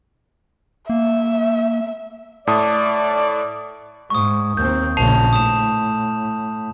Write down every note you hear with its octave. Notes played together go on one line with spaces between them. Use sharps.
A#3 E5
A2 D5 A5 D#6
G#2 C#6 D#6
D#2 C4 G6
A#1 C#3 A5 C7 F7
A2 D#6 E7